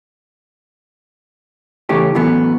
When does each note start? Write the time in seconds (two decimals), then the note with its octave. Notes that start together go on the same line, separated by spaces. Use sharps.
1.89 C#3 E3 A3 C#4 G4
2.15 F#2 A2 E3 A3 B3